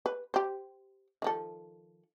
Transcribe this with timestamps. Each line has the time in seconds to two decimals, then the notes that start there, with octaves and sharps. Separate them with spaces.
0.06 B4
0.34 G4 C5
1.22 D#3 F3 A4